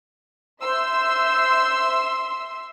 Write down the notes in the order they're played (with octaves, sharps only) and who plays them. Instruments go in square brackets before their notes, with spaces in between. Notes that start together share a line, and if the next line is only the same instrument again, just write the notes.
[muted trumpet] C5 [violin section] E5 C6 E6